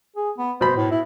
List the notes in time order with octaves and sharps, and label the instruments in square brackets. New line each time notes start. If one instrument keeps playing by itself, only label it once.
[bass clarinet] G#4
B3
[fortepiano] B2 B5 [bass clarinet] C5
[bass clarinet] A2
E4